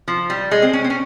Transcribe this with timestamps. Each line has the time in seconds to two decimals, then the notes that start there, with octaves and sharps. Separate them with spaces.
0.08 F3
0.30 G3
0.51 G#3
0.62 C4
0.73 C#4
0.84 C4
0.90 C#4